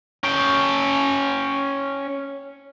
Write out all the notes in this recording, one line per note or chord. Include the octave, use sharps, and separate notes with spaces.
C#4 G5